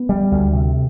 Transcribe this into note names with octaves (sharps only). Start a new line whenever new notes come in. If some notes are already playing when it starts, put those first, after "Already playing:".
Already playing: B3
G3
D2
C3